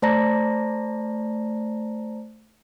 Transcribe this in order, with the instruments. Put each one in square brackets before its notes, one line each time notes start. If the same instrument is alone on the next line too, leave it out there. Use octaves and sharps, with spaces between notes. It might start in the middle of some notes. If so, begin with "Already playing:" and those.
[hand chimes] A3 C5 D5 A5 A#5 A#6